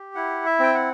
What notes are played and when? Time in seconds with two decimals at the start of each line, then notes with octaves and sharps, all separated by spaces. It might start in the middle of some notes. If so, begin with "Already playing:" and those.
Already playing: G4
0.15 E4 F#5
0.46 E5
0.59 C4 G5
0.74 F#5